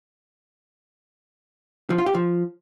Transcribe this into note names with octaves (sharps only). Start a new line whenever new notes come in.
F3
F4
G4
F3